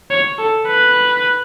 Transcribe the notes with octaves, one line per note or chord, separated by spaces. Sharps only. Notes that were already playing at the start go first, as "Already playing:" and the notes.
C#5
A4
B4